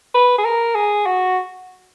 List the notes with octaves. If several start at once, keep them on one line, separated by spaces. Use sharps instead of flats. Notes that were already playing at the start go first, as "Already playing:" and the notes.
B4
G#4
A#4
G#4
F#4